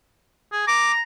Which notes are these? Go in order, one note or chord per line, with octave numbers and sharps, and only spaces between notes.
G#4
A#5 D6